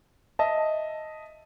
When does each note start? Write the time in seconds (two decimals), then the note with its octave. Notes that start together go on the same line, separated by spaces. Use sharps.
0.39 D#5 E5 A5